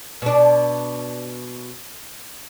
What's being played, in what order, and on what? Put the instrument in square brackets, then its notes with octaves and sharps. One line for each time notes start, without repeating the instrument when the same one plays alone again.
[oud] B2 D4